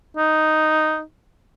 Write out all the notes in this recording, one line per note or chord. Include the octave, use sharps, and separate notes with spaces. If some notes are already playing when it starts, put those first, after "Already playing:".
D#4